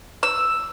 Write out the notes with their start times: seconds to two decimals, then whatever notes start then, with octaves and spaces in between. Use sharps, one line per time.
0.23 E6